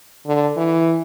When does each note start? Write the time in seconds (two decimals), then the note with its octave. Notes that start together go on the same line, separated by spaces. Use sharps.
0.26 D3
0.57 E3